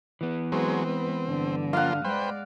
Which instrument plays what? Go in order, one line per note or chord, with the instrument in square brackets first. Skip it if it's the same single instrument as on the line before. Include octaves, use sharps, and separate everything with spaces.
[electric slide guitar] E3 B3
[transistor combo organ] F#3 G#3 C4 [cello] B4
[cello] G#3 B4 [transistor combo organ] C4
[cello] G2 D3
[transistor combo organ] F3 A#3 F4 [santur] F5 F#5
[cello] G#3 D5 [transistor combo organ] B4 C5 G5